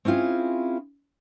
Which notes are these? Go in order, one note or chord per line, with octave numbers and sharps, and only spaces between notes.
C4 C#4 E4 F4 G#4